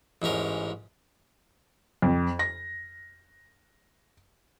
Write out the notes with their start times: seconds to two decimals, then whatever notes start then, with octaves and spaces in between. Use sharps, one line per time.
0.22 A1 G#2 C#4 A#4
2.02 F2
2.39 A#6